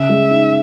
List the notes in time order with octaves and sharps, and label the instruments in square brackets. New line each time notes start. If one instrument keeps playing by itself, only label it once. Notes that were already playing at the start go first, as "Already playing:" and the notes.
Already playing: [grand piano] C#3 [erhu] E5
[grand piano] G#3
D#4